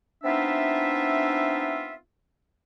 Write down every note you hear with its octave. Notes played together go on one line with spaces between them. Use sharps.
B3 C4 D4 D#4 F4 E5